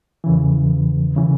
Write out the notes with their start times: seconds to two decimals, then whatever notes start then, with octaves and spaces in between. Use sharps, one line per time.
0.24 E2 C#3 E3
1.16 C#3 E3